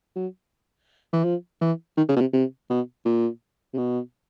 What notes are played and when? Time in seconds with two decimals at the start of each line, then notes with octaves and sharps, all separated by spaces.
0.16 F#3
1.13 E3
1.24 F3
1.61 E3
1.97 D#3
2.09 C#3
2.16 B2
2.21 C3
2.33 C3
2.70 B2
3.05 A#2
3.74 C3
3.77 B2